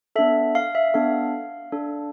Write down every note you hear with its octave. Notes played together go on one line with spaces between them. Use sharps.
B3 D4 A4 E5
F5
E5
B3 D4 A4 F5
D4 A4